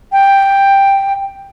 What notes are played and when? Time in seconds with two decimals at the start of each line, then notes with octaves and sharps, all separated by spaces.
0.12 G5